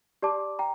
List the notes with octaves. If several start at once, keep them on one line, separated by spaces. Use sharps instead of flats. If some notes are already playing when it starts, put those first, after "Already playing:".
G4 D5 A5 D6
G5 A#5